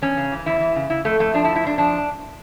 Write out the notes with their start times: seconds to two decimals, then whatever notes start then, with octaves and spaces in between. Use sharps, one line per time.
0.02 E2 C#4
0.17 C#3
0.32 E3
0.46 E2 E4
0.60 E3
0.76 C#3
0.90 C#3 E4
1.05 F2 A3
1.19 F2 A3
1.34 F3 D4
1.45 E4
1.49 F2
1.56 E4
1.64 F2 D4
1.78 F3 D4